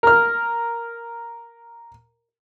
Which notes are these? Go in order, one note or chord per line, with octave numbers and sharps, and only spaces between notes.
A#4 F6